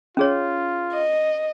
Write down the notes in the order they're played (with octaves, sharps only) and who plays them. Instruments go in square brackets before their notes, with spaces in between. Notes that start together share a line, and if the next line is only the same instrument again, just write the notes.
[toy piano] C#4 G#4 C#5 [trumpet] F4
[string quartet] D#5